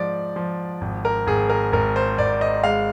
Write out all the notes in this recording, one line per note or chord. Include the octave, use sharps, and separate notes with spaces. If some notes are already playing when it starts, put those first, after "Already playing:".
Already playing: G#2 F3 D5
F3
G#1
A#4
G#1 G#4
A#4
G#1 A#4
C5
G#1 D5
D#5
G#3 F5